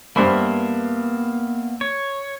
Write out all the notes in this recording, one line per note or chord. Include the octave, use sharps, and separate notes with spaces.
G2 A#3 B3 C5 E5 B5
C#5